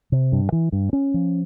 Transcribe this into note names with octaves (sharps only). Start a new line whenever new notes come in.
C3
G2
E3
G2
C#4
F3